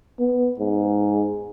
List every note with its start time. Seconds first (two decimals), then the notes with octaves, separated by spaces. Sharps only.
0.19 B3
0.59 G#2